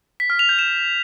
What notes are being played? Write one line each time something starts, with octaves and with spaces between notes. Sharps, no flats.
B6
F6
F7
G6
E7